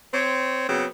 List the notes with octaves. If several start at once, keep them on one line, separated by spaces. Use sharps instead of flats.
C4 C#5
C#3 F#3 B3 C4